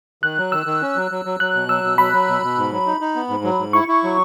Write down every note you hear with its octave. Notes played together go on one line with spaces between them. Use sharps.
D#3 F#6
F#3
D#3 E6
D#3
C#4
F#3
F#3
F#3
F#3 F#6
B2
F#3 E6
B2
F#3 B5
F#3
B2
B2
G#2
F#3
D#4
D#4
B3
G#2
F#3
G#2
E4 C#6
E4
F#3